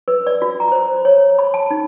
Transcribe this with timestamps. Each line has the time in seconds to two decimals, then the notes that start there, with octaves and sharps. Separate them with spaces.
0.08 B4
0.27 D5
0.42 F4
0.60 A#5
0.72 C5
1.05 C#5
1.39 B5
1.54 A5
1.71 D#4